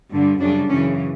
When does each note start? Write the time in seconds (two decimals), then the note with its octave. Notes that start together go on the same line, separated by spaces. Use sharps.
0.11 G2 D3 G3
0.41 F#2 C#3 G3 D4
0.70 F#2 C#3 E3 C#4